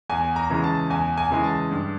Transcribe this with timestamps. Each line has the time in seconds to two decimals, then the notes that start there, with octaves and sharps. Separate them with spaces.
0.10 E2 G#5
0.36 A#5
0.50 C#3 E3 G#3
0.64 A5
0.90 E2 G#5
1.18 G#5
1.30 C#3 E3 G#3
1.44 A5
1.71 G2